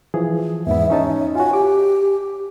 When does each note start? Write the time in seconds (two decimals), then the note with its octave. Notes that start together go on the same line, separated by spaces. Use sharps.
0.14 E3 F3 G#4
0.67 E2 G#2 B3 E5
0.90 C#4 D#4 C#5 A5
1.35 F4 F#4 G#5
1.53 G4 D6